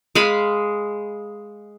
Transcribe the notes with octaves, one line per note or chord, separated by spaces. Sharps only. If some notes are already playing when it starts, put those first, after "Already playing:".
G#3 F5 B5